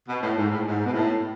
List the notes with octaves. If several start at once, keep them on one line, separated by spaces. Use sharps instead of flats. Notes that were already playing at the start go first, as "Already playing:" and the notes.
B2
A2
G#2
A2
G#2
B2
A2